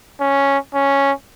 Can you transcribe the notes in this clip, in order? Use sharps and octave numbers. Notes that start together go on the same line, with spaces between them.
C#4
C#4